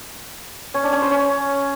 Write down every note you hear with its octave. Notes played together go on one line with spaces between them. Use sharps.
C#4
D4
C#4
C5
C#4